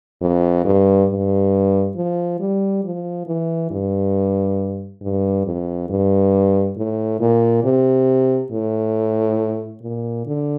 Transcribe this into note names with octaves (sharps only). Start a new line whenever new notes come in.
F2
G2
G2
F3
G3
F3
E3
G2
G2
F2
G2
A2
A#2
C3
A2
A#2
D3